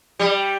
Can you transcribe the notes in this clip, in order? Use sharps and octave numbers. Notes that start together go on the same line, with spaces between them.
G3